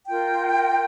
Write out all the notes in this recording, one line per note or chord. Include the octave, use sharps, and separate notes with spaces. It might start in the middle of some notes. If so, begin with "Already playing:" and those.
F4 A#4 G5